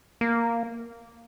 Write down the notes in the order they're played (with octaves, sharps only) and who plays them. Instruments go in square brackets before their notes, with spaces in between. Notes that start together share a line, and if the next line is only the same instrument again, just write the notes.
[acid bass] A#3